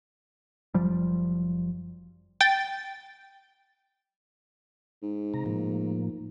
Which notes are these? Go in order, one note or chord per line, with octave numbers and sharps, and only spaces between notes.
F#1 F3 G3
G5 A6
G#2
C3 A#5
A2 F3 A#3